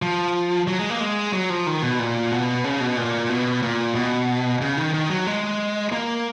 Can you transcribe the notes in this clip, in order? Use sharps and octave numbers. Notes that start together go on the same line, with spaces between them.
F3
F#3
G#3
A#3
G#3
F#3
F3
D#3
B2
A#2
B2
C#3
B2
A#2
B2
A#2
B2
C#3
D#3
D#3
F#3
G#3
A#3